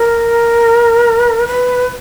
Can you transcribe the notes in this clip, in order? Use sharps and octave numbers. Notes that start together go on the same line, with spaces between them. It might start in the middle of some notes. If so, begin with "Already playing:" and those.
Already playing: A#4
B4